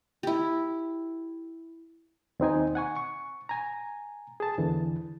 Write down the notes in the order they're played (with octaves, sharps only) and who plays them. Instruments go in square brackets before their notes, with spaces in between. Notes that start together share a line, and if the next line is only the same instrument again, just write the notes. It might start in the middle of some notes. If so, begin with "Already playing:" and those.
[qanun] E4 G4
[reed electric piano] D#2 C4 D#4 G#5
F#5 G#5 C#6
C#6
G#5 A#5
G#4 A5
E2 D3 E3